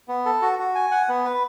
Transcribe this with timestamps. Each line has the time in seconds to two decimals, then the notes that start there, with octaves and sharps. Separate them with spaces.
0.08 B3
0.25 A4
0.42 F#4
0.59 F#4
0.75 G#5
0.91 F#5
1.09 B3
1.25 B4